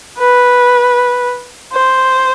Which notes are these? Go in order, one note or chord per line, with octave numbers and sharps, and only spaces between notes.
B4
C5